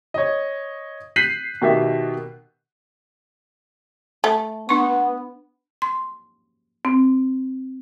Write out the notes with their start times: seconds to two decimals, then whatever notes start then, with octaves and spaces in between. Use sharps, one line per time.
0.14 C#5 D#5
1.16 F#6 G6 B6 C7 D#7 F#7
1.62 B2 D#3 G4 E5
4.24 A3
4.69 B3 D4 C#6
5.82 C6
6.85 C4